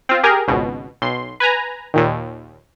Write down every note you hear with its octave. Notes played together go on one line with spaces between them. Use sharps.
C4 F4
G4 G#4 A#4
G#1 C#2 B2
B1 C6
B4 G#5 A#5
D#2 A#2 D#3